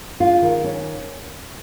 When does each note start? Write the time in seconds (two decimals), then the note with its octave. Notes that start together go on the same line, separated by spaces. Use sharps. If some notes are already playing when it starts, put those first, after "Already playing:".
0.20 G#3 F4
0.42 D#3
0.64 C#4